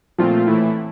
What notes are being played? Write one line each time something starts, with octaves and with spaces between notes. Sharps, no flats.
A#2 F3 A3 C4 F4
A2 E3 A3 E4